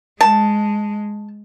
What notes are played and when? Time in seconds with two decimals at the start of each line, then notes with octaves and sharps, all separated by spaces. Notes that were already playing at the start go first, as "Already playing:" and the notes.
0.21 G#3 A5